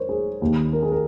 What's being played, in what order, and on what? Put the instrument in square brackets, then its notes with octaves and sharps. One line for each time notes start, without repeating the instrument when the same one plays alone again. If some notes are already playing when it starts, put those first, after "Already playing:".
Already playing: [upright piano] A#4 C5 C#5
G#4
D#2 D#3
A#4
G#4
A#4